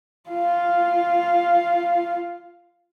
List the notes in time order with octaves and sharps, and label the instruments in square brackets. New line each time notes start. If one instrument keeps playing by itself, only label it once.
[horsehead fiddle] F4 F5